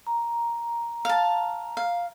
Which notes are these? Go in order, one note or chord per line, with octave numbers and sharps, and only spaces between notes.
A#5
F5 A5
F5